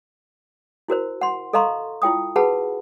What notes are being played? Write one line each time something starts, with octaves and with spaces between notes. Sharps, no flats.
E4 F#4 A#4 C5
F#5 C6
A4 D#5 F5 A#5 C6 C#6
E4 F4 G5 D#6
F#4 G#4 B4 F#5 A5 B5